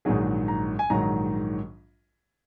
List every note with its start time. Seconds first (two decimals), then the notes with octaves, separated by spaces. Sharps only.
0.05 A#1 G#2 D#3 F#3 G#4
0.48 A#5
0.79 G#5
0.90 A#1 G#2 D#3 F#3 A#5